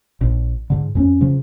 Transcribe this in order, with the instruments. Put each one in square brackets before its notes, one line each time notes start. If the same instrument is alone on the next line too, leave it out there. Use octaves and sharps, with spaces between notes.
[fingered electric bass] A#1
G#2 D3
F2 G#3 C#4
C#3 F3